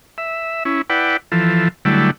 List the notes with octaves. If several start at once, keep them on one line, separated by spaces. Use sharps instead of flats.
E5
C#4 E4
E4 B4 D5 F#5 G5
E3 F3 A4
D3 F#3 G3 A3 E4